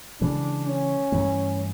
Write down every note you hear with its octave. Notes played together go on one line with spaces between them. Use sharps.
C#3 E3 G#3 D4
C#4
G2 E3 A3